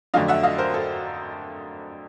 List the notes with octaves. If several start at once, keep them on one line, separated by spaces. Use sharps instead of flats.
F2 D3 F#3 A3 D4 D#5 F5
E5 F#5
D#5 F5
A#4 C5
A4